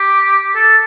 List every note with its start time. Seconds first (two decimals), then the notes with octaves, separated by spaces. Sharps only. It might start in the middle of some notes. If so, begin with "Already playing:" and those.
Already playing: G4
0.55 A4